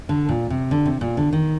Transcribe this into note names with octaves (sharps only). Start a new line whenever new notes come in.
D3
A#2
C3
D3
C3
A#2
D3
D#3